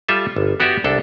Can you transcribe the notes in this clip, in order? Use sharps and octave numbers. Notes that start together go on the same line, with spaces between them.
G3 F4 A4 E5
G1
B3 F#4 G4 D5 E5
C2 D4 A4